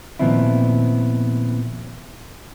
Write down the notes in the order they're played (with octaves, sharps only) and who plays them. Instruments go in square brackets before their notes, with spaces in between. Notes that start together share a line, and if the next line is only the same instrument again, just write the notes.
[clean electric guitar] A#2 D#3 F3 B3 C4 E4